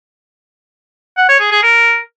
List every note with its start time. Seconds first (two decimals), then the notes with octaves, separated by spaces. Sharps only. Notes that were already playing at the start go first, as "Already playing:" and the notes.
1.17 F#5
1.29 C#5
1.40 G#4
1.52 G#4
1.63 A#4